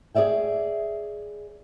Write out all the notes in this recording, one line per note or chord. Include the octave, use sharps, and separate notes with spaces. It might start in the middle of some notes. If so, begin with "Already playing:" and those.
G#4 C#5 D5 E5 G5